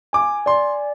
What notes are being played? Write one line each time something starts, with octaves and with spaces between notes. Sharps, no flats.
G#5 D6
D5 C6